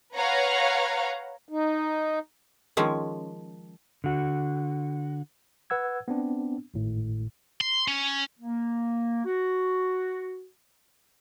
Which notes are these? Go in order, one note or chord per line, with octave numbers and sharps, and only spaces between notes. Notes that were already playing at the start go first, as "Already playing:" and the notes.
B4 C#5 F5 F#5 A#5
D#4
D#3 F3 G#3 C#4
D3 F#4
B4 F#5 E6 G#6
B3 C4 D4
G#1 A2
C6
C#4
A#3
F#4